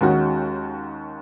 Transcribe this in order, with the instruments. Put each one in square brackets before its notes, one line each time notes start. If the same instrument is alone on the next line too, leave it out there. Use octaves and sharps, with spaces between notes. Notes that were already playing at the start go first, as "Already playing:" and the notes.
[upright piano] D#2 D#3 G#3 C#4 F#4